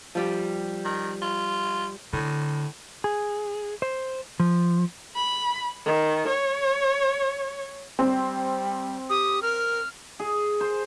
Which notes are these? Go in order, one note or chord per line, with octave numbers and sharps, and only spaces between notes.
F3 G3 G4
D#3
F4
A2 D3
G#4
C5
F3
B5
D#3
C#5
G3 C4
G4 D#6
A#4 F6
G#4
C5